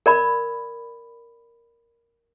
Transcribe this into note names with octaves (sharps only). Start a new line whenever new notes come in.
A#4 D5 B5